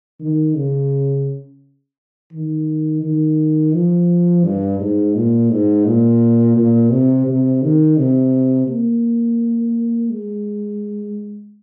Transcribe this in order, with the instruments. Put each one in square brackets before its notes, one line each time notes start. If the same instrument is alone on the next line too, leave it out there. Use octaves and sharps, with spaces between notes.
[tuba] D#3
C#3
D#3
D#3
F3
G2
G#2
A#2
G#2
A#2
A#2
C3
C3
D#3
C3
A#3
G#3